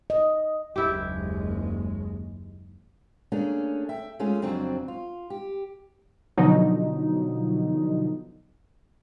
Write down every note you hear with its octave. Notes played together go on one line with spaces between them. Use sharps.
D#5
F#1 D#2 G#3 E4 G4
A3 A#3 C#4 D4 G#4
E5 G5
G#3 A3 C#4 F4 G#4
F2 C#3 F#3 G3 C4 D4
F4
G4
B2 D3 F3 F#3 D#4